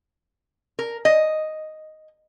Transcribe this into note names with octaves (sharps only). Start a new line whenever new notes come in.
A#4
D#5